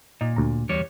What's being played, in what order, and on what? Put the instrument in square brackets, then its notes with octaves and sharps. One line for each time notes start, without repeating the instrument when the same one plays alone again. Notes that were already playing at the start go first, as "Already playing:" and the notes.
[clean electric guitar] A#2 [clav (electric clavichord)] D#4
[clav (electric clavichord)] D2 A#5
[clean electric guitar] E2 G3 C#5